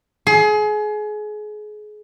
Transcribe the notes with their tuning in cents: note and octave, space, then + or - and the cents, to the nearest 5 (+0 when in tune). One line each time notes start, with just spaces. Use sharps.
G#4 +30